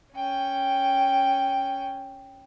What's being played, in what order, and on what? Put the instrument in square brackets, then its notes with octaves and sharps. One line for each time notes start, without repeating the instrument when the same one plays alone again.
[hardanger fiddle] C#4 G5